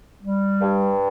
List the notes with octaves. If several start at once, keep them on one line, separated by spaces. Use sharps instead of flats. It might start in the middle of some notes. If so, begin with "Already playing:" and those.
G3
G2